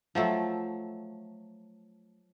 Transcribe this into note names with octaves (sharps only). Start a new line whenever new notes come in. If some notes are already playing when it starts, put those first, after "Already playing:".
F3 F#3 A3 A4